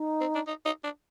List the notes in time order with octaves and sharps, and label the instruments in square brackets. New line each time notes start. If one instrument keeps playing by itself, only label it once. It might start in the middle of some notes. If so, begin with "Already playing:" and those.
Already playing: [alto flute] D#4
[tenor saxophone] C4
D4
D#4
D#4
D4